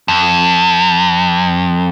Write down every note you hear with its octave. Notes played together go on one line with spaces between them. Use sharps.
F2